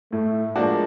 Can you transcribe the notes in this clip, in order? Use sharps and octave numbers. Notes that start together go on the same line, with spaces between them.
A2 A3
F3 G#3 A#3 D4 F#4